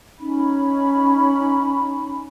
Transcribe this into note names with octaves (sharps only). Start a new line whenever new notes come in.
C#4 D#4 B5